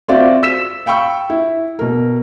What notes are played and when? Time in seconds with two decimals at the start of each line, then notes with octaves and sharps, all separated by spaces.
0.08 C4 F4 F#4 D5 E5
0.43 E6 B6 E7
0.86 F5 G5 B5 C#6 E6
1.30 E4
1.79 B2 A#4